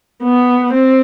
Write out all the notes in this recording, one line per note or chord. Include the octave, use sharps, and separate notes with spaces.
B3
C4